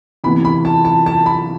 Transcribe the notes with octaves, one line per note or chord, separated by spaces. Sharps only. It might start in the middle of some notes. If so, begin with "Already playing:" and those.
C3 E3 B3 B5
B5
A5
A5
A5
B5